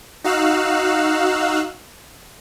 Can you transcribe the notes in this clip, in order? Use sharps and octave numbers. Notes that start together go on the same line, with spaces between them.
D#4 F#4 F5 E6 F#6